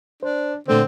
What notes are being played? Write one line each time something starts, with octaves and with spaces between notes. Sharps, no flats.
D4 C5
A#2 D3 A3 C4 C5